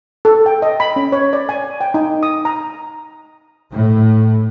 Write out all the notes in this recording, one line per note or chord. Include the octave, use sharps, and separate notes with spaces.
A4
G5
D#5
B5
C#4
C#5
D5
G#5
G5
D#4
D#6
A#5
A2